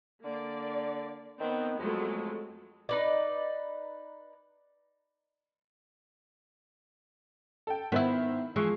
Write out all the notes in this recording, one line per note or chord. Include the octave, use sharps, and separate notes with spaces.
D3 A#3 D5
D#3 B3 C4
F2 F#3 G#3 A3
D#4 B4 D5
A4 G5
D#3 B3 E4 C5 E5
E3 F3 G#3 C#6 C7